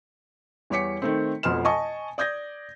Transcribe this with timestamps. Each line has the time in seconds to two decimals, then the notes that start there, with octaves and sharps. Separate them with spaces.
0.70 E2 G3 C#5 D6 B6 C#7
1.02 D#3 A3 C4
1.43 F1 F2 B2 C6 F6 E7
1.65 D#5 G#5 A5 C#6 D#6
2.18 D5 D#6 G6 G#6 A#6